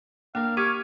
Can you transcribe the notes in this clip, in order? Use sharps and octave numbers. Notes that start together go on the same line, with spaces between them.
A#3 D4 A#4 F5
G4 C#6 D6 F6 G#6 B6